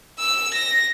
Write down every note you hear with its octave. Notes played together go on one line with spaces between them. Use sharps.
E6
A#6